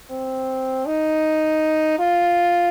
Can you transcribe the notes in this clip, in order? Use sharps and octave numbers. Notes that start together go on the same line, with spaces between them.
C4
D#4
F4